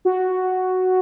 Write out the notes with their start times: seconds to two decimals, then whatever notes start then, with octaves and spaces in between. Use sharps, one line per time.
0.05 F#4